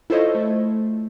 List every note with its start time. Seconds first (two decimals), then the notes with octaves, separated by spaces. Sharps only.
0.10 E4 F4 A4 C5 C#5 D#5
0.35 A3